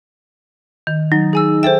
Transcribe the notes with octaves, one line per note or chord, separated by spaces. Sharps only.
D#3
F#3 D#4 A6
G#4 G#5 E6
G#4 A4 C5 E5 G5